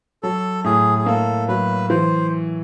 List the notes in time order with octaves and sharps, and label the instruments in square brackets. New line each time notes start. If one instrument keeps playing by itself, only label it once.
[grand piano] F#3 [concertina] A4
[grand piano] A2 [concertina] G#4
[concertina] G#4
[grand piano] A#3 [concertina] A4
[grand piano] F#3 [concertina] B4
[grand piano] E3 [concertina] C5